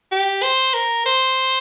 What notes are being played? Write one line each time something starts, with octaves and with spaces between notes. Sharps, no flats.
G4
C5
A#4
C5